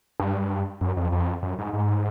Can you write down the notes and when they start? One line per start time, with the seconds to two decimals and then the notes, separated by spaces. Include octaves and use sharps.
0.20 G2
0.81 F#2
0.97 F2
1.12 F2
1.43 F#2
1.59 G#2
1.74 G#2